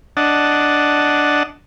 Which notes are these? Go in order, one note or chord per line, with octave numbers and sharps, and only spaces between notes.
D4 D#5 F#5 A5